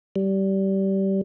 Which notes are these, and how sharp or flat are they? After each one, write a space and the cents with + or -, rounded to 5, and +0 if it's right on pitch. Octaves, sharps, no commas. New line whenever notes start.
G3 -20